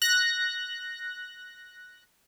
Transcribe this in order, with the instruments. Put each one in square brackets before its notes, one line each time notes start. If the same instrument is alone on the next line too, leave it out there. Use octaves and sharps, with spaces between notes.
[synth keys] F#6 A#6